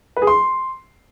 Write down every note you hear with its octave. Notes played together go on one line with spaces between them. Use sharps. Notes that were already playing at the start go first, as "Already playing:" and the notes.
B4
G#4
C6